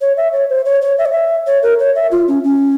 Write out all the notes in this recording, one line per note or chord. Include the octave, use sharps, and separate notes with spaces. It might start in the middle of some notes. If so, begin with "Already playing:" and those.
C#5
E5
C#5
C5
C#5
C#5
E5
C#5
E5
C#5
A#4
C#5
E5
F4
C#4
C#4